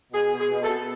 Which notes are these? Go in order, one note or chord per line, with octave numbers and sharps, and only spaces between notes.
B2 G#4
B2
G#4
B2
A4
B2